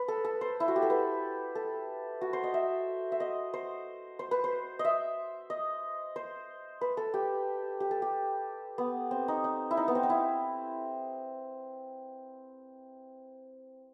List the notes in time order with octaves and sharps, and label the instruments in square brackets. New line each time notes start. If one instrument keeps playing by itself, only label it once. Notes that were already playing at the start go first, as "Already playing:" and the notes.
Already playing: [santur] B4
A4
A4
C5
E4
F#4
G4
A4
B4
A4
F#4
C5
D#5
E5
E5
D#5
C5
C5
B4
C5
D#5
E5
D#5
C5
B4
A4
G4
G4
A4
G4
B3
C4
D#4
D#4
E4
D#4
B3
C4
D#4
E4